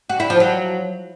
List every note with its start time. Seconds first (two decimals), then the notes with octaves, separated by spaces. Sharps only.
0.09 F#4
0.20 E4
0.30 F3
0.40 F#3